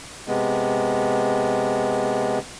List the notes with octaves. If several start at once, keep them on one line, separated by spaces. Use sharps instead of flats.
C3 G#3 B3